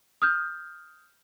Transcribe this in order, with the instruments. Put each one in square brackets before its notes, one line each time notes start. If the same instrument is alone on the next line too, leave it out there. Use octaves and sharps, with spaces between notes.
[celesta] D#6 F6 G6